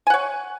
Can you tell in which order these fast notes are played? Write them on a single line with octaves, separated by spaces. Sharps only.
G#5 F#5 C#5